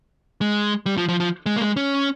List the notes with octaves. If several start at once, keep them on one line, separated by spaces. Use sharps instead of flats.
G#3
G3
F3
F3
F3
G#3
A#3
G#3
C#4